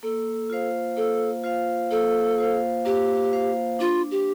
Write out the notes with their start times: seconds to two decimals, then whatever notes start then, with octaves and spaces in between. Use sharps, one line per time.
0.03 A#3 A4
0.50 F4 C5 F5
0.97 A#3 A4
1.44 F4 C5 F5
1.91 A#3 A4
2.38 F4 C5 F5
2.85 A#3 G4
3.33 F4 C5 F5
3.79 D4 F4
4.11 G4